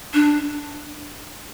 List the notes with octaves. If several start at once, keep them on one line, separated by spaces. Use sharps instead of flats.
D4